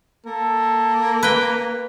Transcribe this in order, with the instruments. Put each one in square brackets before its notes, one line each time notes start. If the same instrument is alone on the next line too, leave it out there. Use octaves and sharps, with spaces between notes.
[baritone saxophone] A#3 [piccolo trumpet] A4
[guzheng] B4 G5